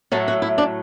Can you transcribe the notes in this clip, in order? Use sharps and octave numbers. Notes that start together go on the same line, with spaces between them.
A2 F#3 A3 A4
F#4
E4
D4